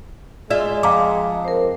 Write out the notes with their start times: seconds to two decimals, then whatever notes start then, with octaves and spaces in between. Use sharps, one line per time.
0.50 G#3 F4 D5 E5
0.83 F2 F5 A#5 D6
1.45 A#4 C5